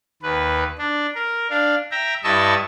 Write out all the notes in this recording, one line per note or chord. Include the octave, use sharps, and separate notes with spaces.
D#2 B4
D4
A#4
D4 F5
E5 G5 A#5
G2 E4 D#5 A5 C#6 E6